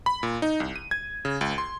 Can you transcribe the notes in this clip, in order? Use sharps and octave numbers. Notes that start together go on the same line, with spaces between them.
B5
A#2
D#4
C2
D#7
G#6
C#3
C#2
C6